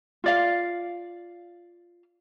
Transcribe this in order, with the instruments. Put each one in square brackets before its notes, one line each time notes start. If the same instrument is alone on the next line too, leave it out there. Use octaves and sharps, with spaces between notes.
[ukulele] F4 D5 F5